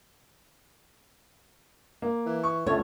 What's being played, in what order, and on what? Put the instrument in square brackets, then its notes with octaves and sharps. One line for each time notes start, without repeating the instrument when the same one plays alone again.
[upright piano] A#3
[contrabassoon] E3
[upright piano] C#6
[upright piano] C#2 [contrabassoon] D3 [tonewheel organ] A3 [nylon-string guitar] B3 C#5